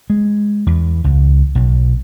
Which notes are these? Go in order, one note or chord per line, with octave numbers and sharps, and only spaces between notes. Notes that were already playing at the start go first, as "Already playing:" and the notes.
G#3
E2
C#2
B1